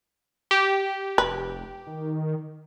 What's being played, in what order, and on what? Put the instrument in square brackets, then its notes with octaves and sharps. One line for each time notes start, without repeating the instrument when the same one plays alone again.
[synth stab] G4
[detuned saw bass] F1 [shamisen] B4
[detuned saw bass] D#3